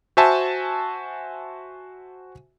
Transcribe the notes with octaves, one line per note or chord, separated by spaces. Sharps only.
F#4 C5 E5 G#5 A5